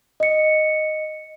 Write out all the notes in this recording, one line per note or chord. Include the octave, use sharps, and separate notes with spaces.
D#5 C#7